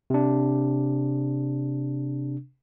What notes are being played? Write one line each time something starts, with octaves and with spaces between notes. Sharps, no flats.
C3 D4